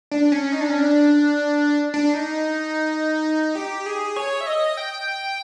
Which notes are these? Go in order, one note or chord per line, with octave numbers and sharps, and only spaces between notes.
D4
C#4
D#4
D4
C#4
D4
D4
D#4
G4
G#4
C#5
E5
D#5
G5